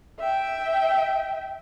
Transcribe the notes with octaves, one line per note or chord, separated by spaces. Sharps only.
E5 G5